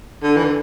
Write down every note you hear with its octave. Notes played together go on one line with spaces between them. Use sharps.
D3
E3
D3